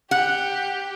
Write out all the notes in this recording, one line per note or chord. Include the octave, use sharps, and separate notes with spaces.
G4 F#5